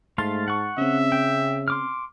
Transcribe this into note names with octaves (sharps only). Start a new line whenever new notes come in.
G#2 A3 F5 A5 C6 F6 A6
F#5 C#6
C#3 C4 C#4 E5
G5
C6 D6 F6